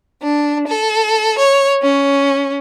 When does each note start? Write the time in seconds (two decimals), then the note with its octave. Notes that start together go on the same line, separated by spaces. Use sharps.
0.21 D4
0.67 A4
1.37 C#5
1.80 C#4